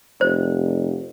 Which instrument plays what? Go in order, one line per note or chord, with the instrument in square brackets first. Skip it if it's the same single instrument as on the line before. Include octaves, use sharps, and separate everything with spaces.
[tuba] F1 [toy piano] C5